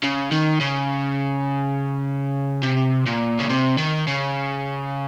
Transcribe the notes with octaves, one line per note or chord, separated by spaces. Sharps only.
C#3
D#3
C#3
C3
A#2
C#3
C3
D#3
C#3